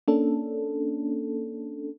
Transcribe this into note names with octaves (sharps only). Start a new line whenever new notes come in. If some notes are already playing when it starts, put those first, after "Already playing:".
A#3 C#4 D4 A4